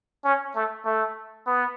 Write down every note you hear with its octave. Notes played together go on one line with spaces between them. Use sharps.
C#4
A3
A3
B3